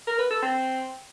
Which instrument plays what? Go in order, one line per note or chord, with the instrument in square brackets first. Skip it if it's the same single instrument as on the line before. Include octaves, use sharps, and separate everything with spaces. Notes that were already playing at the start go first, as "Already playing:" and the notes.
[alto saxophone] A#4
B4
A4
C4